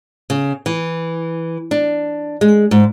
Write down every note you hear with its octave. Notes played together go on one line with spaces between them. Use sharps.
C#3
E3
D4
G#3
G#2